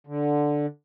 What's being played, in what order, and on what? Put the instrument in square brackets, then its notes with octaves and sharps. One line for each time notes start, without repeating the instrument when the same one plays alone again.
[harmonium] D3